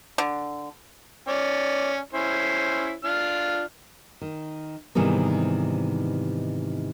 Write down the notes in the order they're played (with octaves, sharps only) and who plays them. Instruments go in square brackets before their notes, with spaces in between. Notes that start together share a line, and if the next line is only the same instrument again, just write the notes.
[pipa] D3
[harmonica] C#4 D5
C#4 E4 C5
D4 F4 F6
[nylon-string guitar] D#3
G#2 C3 D#3 E3 G3 B3